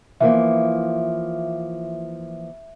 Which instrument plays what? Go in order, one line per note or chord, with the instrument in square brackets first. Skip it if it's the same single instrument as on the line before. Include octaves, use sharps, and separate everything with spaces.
[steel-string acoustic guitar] E3 F3 A#3 [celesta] E5